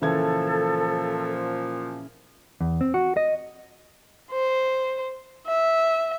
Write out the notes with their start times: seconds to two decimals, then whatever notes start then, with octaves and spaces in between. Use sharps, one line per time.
0.02 A#2 C#3 E3 F3 A4 G#6
2.61 E2
2.81 C4
2.94 F#4
3.17 D#5
4.31 C5
5.47 E5